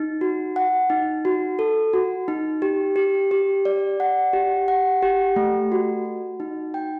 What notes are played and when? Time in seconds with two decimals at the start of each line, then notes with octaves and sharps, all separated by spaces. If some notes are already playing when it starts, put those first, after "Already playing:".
Already playing: D#4
0.21 F#4
0.56 F#5
0.90 D#4
1.25 F#4
1.59 A4
1.93 F#4
2.28 D#4
2.62 G4
2.96 G4
3.31 G4
3.65 D5
4.00 F#5
4.33 G4
4.68 F#5
5.02 G4
5.36 A3
5.72 F#4
6.05 F#4
6.40 D#4
6.74 G5